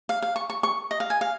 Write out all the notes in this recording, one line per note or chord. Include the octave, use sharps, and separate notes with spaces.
F5
F5
C#6
C#6
C#6
D#5
F5
G#5
F5